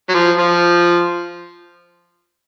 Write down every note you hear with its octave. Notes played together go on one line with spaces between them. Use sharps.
F#3
F3
F3